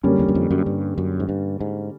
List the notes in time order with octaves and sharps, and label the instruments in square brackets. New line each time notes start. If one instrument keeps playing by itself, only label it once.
[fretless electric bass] F#2 [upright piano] D3 G3 A#3 C#4
[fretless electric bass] E2
F#2
F2
F#2
G2
F#2
G#2
G2
G#2